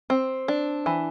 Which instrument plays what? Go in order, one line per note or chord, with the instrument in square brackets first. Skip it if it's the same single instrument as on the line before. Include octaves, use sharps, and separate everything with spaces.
[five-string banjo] C4
D4
E3